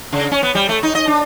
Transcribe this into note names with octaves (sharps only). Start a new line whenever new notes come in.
C#3
C#4
B3
G3
A3
D#4
D#5
D4